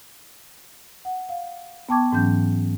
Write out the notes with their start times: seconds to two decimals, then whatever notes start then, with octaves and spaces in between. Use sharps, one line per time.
1.05 F#5
1.29 F5
1.89 B3 G5 A5 C#6 D6 G#6
2.12 G#2 E3 F#3 C#4 G6